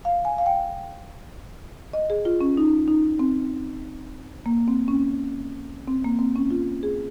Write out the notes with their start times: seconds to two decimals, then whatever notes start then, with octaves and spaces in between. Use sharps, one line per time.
0.05 F5
0.25 G#5
0.38 F5
0.46 G5
1.93 D#5
2.10 G#4
2.25 F4
2.41 C#4
2.57 D#4
2.88 D#4
3.19 C4
4.46 A#3
4.68 C4
4.88 C#4
5.88 C4
6.04 A#3
6.19 C4
6.36 C#4
6.51 F4
6.83 G#4